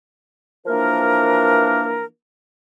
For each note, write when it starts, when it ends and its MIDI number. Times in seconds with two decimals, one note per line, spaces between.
0.66 2.05 52
0.66 2.05 53
0.66 2.05 58
0.66 2.05 62
0.66 2.05 70